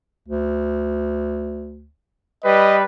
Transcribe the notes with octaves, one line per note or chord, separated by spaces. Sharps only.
D2
G3 B4 D#5